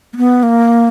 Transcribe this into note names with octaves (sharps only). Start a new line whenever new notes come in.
A#3
B3
A#3